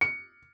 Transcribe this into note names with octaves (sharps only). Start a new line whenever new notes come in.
C#7